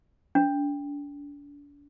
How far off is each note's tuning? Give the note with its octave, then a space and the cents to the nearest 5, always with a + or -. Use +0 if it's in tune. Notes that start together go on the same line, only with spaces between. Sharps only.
D4 -35